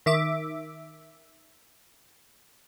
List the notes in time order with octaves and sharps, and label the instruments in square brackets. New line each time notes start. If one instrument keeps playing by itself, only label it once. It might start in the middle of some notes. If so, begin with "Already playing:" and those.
[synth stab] D#3 E5 D6